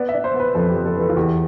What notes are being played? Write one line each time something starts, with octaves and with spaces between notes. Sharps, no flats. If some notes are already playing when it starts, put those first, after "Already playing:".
Already playing: B3 D5
D4 E5
C5
B3
B4
F2 A4
G4
F2
A4
E3 A4
F4
E2 G4